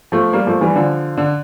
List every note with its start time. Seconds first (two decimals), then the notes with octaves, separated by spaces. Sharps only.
0.12 F3 A3
0.33 G3 A#3
0.47 F3 A3
0.61 E3 G3
0.76 D3 F3
1.17 D3